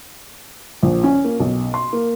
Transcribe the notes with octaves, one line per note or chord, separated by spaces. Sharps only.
A#1
C#4
A#3
B1
C6
A#3